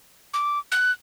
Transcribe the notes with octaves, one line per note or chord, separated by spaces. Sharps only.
D6
F#6